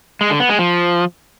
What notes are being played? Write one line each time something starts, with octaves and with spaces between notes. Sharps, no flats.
G#3
D3
B3
G#3
F3